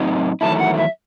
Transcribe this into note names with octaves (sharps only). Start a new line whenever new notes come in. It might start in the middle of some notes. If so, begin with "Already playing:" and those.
Already playing: A2 F#3 C4 D#4
E2 D#3 F#3 A3 E4 A5
F#5
E5